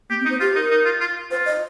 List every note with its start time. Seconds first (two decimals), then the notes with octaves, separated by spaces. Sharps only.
0.10 A#3 G4
0.20 C4
0.25 D#4
0.30 C5
0.40 F4 G4
0.55 D#4 A#4
0.71 D#4
0.85 F4
1.00 F4
1.31 F4 C5
1.46 D#5